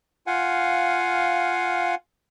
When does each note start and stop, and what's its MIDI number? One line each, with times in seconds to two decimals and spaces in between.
0.27 1.95 65
0.27 1.95 77
0.27 1.95 78
0.27 1.95 80